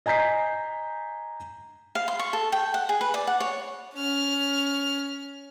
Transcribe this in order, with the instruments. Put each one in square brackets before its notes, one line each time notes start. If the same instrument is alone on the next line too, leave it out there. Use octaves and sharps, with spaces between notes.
[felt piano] D#5 G#5 A#5 G6 B6 C7
[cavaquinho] F5
C6
C#6
A4
G5
F#5
G#4
B4
D5
F#5
C#5
[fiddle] C#4 F6